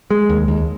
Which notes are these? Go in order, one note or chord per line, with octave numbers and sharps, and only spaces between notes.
G#3
D#2
D#2